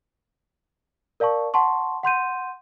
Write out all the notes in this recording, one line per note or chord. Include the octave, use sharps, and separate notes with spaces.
A#4 D5 F5 A5 C#6
F#5 A5 C6 C#6
F#5 C6 G6 D#7